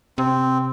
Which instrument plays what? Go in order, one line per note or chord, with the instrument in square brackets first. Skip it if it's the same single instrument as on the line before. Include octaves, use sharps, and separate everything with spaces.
[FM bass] C3 [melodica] C4